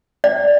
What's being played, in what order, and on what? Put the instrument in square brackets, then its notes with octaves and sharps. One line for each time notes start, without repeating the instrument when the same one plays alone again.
[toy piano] D5